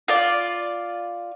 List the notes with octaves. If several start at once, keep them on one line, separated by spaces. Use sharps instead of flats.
F4 D5